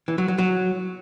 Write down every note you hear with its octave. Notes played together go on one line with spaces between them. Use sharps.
E3
F#3
F#3
F#3